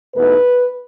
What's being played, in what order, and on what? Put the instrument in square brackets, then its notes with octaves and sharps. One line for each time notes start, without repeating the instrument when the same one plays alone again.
[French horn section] E2 B2 A3 D#4 B4